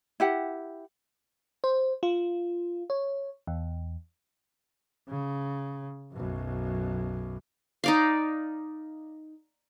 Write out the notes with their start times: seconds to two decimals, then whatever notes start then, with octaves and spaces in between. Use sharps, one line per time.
0.20 E4 G4 F#5
1.64 C5
2.03 F4
2.90 C#5
3.47 E2
5.09 C#3
6.13 B1 F#2
7.84 D#4 D5 F5